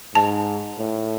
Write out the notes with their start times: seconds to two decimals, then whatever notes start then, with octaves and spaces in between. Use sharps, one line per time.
0.15 G#2 A5
0.79 A2